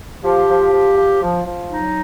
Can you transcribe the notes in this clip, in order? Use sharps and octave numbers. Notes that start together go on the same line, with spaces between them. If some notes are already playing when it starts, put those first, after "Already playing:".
F3 G4
F3
F3
F3
F3
F3
F#3 D#4